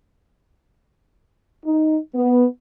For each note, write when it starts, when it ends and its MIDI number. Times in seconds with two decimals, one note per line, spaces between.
1.64 1.96 63
2.15 2.45 59